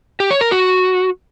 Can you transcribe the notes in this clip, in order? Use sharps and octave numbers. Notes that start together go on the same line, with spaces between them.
G4
C#5
A#4
F#4